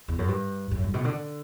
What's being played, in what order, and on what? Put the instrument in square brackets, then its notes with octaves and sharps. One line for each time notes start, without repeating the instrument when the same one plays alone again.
[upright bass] E2
F#2
G2
F#2
G2
B2
D3